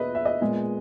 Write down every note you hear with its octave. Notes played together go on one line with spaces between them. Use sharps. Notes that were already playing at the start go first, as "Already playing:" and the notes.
Already playing: B2 A#3 B4 D#5 E5
E5
D#5
A#2 G#3 B3